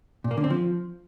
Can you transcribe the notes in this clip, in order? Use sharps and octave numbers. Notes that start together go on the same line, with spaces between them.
A#2
A#3
D3
C4
F3